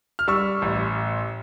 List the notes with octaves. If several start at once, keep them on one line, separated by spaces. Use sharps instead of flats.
F6
G3 C#6 E6
A1